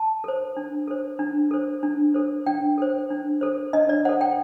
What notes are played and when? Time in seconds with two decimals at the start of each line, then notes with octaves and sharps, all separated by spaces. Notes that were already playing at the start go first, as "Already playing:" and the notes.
Already playing: A5
0.24 A4 C5
0.57 D4
0.88 A4 C5
1.19 D4
1.51 A4 C5
1.83 D4
2.14 A4 C5
2.46 D4 G5
2.78 A4 C5
3.10 D4
3.41 A4 C5
3.73 D4 D#5
3.89 D5
4.05 A4 C5 F#5
4.21 G5